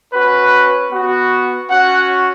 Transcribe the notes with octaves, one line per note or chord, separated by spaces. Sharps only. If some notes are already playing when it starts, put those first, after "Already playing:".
C#4 F#4 B4
B3 F#4
C#4 F#4 F#5